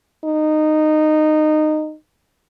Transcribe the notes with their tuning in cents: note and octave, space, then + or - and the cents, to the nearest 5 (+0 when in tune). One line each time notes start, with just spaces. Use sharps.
D#4 -15